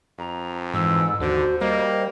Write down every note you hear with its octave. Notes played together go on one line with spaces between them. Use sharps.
F2 A#5
G#2 E3 E6
D#2 D3 F#4 C5
G3 A#3 D#5